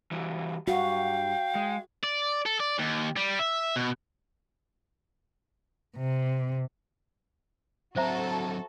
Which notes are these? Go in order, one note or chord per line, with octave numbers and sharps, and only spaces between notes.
E3 G3 F#4
G2 F#4 F5 G5
G#3
D5
A4
D5
D#2
G3
E5
B2
C3
F#3 C4 F#4 A4 C5 E5 A#5